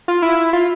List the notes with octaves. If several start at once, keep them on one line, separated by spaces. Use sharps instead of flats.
F4
E4
F4